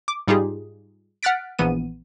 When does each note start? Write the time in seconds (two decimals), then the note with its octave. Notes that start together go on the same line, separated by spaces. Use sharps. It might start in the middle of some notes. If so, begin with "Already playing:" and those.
0.08 D6
0.28 G#2 G3 D#4 F4 G4 G#4
1.23 F#5 F6 F#6 A6 B6 D7
1.59 A#1 E3 B3 D#7